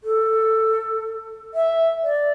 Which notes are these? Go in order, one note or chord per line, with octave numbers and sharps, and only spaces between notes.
A4
E5
D5